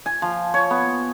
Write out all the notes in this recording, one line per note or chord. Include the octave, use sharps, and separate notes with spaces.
G#5
F3
C#5
B3